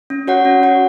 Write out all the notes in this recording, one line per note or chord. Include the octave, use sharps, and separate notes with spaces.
C#4
F#4 C#5 F#5
C#4
F#4 C#5 F#5